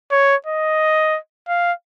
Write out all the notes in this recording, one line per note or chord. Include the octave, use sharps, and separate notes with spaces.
C#5
D#5
F5